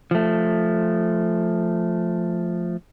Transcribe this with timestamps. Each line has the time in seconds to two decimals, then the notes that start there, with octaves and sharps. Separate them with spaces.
0.11 F3 A3